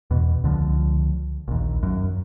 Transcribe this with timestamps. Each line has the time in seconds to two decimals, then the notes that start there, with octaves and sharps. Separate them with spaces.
0.11 E2 B2
0.44 C#2 D3 D#3 F3
1.48 A#1 D#2
1.83 F#2